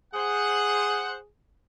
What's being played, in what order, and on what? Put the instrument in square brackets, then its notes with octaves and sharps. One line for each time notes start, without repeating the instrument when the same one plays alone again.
[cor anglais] G#4 [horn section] C5 F#5